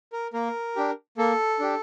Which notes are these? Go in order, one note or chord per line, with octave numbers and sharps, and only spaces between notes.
A#4
A#3 A#4
D4 G4
A#3 A4
D4 G4